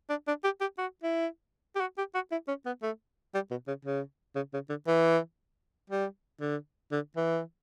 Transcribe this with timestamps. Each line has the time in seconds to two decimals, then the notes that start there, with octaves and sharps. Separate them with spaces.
0.09 D4
0.27 D4
0.44 G4
0.61 G4
0.78 F#4
1.03 E4
1.75 G4
1.80 F#4
1.97 G4
2.14 F#4
2.31 E4
2.48 C#4
2.66 B3
2.82 A3
3.34 G3
3.50 B2
3.67 C#3
3.85 C#3
4.35 C#3
4.53 C#3
4.70 D3
4.87 E3
5.90 G3
6.40 D3
6.91 D3
7.16 E3